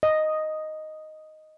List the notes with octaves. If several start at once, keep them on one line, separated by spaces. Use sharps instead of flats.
D#5